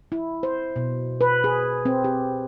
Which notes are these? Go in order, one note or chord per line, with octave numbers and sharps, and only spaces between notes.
E4
C5
B2
B4
G#4
C4
G4